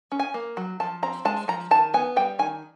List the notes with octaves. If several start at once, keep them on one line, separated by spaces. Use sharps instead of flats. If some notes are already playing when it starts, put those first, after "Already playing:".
C#4
G#5
A#3
F#3
F3 A5
C4 A#5
G#3 A5
F3 A#5
D#3 A5
B3 G#5
G3 G5
D#3 G#5